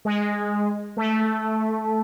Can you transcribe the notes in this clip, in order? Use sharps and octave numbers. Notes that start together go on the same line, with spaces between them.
G#3
A3